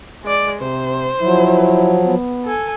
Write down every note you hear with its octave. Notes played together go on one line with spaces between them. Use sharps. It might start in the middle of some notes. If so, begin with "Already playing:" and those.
G#3 D5
C3 C5
F3 F#3 E4
B3
A4 G#5